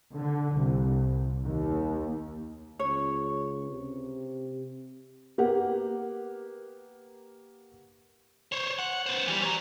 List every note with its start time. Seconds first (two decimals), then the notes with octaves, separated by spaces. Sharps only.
0.15 D3
0.57 C2
1.44 D#2
2.79 C#2 C#5
3.70 C3
5.38 A#3 B3 G4 A#4 F#5
8.52 C5 C#5
8.79 F#5
9.06 B3 C5
9.28 E3 G3
9.43 C#5 A#5